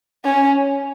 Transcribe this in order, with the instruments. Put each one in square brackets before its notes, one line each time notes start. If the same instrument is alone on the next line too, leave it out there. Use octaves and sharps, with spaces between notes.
[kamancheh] C#4